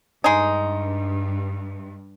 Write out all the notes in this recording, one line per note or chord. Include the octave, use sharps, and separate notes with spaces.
G2 G#3 D#4